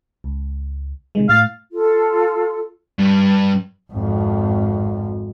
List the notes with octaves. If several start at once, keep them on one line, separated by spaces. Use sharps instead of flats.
C#2
C3 D#3 G#3
A2 F5 A6
F4 A4
G2
G#1 F2